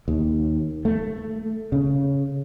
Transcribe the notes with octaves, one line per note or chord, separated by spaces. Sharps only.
D#2
A3
C#3